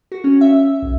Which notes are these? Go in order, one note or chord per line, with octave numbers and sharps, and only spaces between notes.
F#4
C#4
E5
B1